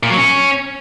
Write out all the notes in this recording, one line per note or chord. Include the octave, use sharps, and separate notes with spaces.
A#2
F#3
C#4